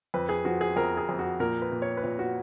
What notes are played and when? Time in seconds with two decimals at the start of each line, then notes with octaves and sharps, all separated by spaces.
0.14 F2 B4
0.29 G#4
0.45 F3 F#4
0.61 G#4
0.76 F2 A#4
0.97 G#4
1.09 F2
1.19 F#4
1.40 A#2 A#4
1.62 B4
1.72 A#2
1.82 C#5
1.97 B4
2.03 A#2 C#5
2.19 F#4